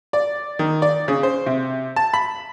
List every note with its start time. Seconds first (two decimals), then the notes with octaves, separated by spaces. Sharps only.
0.13 D5
0.59 D#3
0.82 D5
1.08 C#3
1.23 C5
1.46 C3
1.96 A5
2.13 B5